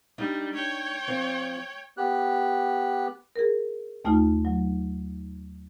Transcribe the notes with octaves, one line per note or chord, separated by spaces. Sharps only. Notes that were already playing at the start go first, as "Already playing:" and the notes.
G3 D4 D#4
C#5 G5
F3 C4
B3 G4 F#6
G#4 A#4
D#2 A3 D#4 F4 F6
F#3